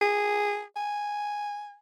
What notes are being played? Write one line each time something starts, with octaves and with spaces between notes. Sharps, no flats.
G#4
G#5